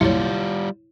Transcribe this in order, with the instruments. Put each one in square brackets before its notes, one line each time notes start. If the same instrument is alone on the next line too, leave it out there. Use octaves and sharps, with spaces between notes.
[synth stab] C2 F#2 A#2 [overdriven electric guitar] G3 F4 [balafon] E4 C#5